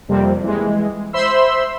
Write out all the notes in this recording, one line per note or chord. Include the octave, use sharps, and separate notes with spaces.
F2 C3 G3 A#3 C4
E3 G#3
C5 E5 B5 C6 E6